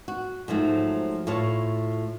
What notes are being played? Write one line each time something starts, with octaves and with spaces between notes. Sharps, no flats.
F#4
G#2 F3 F#3 A3
A2 F4 C#5 A5